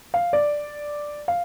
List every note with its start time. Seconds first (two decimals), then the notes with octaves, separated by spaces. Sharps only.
0.14 F5
0.33 D5
1.28 F5